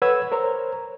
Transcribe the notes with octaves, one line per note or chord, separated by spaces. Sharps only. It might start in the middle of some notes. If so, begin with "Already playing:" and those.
A4 B4 C#5 F#5 E6 G#6
A#4 C5 C#5 A#5